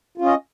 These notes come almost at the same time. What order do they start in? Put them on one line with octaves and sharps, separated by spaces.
F4 C#4 D#5